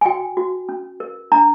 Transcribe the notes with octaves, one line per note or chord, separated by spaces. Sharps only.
G#5
F#4 G5
F#4
C#4
A#4
D4 A#5